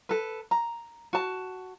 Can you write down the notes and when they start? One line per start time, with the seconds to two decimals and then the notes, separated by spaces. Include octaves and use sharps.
0.09 A4 B4
0.51 A#5
1.13 F#4 A5